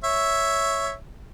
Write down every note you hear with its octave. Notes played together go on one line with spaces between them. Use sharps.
C#5 E5